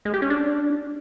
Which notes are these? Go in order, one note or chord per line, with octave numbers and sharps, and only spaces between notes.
G#3
G4
C#4
D4